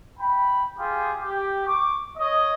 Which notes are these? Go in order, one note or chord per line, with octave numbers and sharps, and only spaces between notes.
G5 B5
F4 G4 G#4
G4
C#6 D6
C#5 D#5